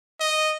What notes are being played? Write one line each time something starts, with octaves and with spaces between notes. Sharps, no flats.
D#5